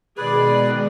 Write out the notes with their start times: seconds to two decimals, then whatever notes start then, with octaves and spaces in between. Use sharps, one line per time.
0.17 B2 D#3 G#3 G#4 B4 D5